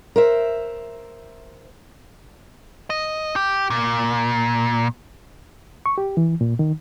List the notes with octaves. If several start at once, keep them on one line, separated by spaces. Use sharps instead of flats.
A#4 C5 E5
D#5
G4
A#2
C#6
G4
E3
A#2
D#3